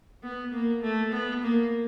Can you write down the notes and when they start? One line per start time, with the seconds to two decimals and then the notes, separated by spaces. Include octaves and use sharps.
0.23 B3
0.53 A#3
0.82 A3
1.12 B3
1.42 A#3